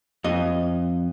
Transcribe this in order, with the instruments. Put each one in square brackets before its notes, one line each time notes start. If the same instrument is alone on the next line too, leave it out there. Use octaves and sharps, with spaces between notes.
[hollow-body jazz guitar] F2 D#5